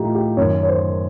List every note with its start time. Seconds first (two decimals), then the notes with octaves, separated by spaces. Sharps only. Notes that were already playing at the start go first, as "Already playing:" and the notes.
Already playing: A2 F3 D#4 F4 G4
0.15 G4
0.37 F#2 D#3 C#5
0.63 C#5
0.68 C5